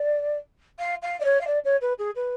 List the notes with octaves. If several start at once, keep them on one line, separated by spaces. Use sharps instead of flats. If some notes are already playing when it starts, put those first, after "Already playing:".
Already playing: D5
F5
F5
D5
C#5
F5
D5
C#5
B4
G#4
B4